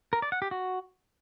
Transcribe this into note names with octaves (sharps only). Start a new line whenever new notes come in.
A#4
D5
F#5
G4
F#4